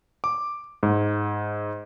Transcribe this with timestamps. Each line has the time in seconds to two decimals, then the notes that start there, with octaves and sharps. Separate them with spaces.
0.24 D6
0.83 G#2